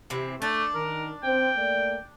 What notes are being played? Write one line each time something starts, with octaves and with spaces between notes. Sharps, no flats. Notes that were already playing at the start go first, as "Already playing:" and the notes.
C3 E3 C4
A3 D4
D#3 A#4
C4 G5
A3 A#3 D5